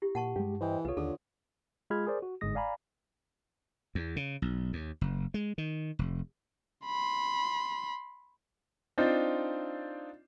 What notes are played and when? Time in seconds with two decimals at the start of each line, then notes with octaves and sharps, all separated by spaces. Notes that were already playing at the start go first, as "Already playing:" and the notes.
0.02 E4 G4
0.15 A#2 F#5 A5 C#6
0.36 G2 G#3 G4
0.61 E3 C5 D#5 G5
0.85 C2 F4 A4 B4 C#5
0.97 D#2 D3 A4
1.90 G#3 F4 G#4 B5 F6 G#6
2.07 G#4 A#4 C5 D5
2.22 F#4
2.41 G1 G#2 G#3 D#6 A#6
2.55 D5 F5 G#5 A#5 B5
3.95 E2
4.16 C#3
4.42 B1
4.73 D#2
5.01 F#1
5.34 G#3
5.58 D#3
5.99 F1
6.86 B5 C6
8.98 C4 D4 D#4 F4 C5 D5